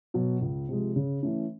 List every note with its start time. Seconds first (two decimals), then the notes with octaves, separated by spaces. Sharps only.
0.14 B2 F#3
0.41 C#2
0.69 C3 F3 G#3
0.96 C#3
1.23 E3 A3 C#4